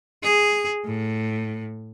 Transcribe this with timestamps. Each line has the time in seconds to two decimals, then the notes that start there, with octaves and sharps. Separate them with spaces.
0.23 G#4
0.85 A2